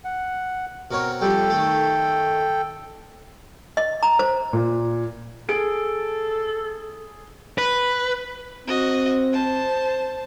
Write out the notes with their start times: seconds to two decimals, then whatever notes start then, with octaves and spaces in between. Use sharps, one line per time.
0.04 F#5
0.91 B2 C4 A#4 C#5
1.21 F2 G3 A4 G5
1.50 D#3 A3
3.77 D#5
4.03 A#5
4.19 C5
4.53 A#2
5.49 G#4 A4 D7
7.58 B4
8.67 C4 F#4 D#5
9.33 C5 A5